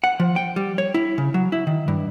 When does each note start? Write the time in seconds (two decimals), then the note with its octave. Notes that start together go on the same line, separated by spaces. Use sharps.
0.04 F#5
0.20 F3
0.36 G5
0.56 G3
0.78 C#5
0.94 E4
1.18 C#3
1.34 F#3
1.52 E4
1.67 D#3
1.88 G2